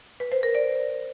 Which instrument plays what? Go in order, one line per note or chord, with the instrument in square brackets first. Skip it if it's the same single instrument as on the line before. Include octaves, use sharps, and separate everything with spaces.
[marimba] B4
C5
A#4
D5